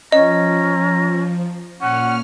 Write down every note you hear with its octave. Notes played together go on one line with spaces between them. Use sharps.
F3 C#4 D#5 A#5
A#2 C#4 F#5 F6